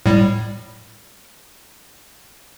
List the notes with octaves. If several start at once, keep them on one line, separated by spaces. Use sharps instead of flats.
A2 G3